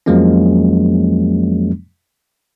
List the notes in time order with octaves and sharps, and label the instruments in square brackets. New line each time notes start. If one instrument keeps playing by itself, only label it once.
[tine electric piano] F2 F3 F#3 G#3 A#3 C#4